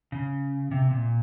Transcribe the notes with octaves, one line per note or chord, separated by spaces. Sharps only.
C#3
C3
A#2